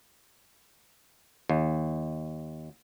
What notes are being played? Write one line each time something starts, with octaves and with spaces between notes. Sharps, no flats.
D#2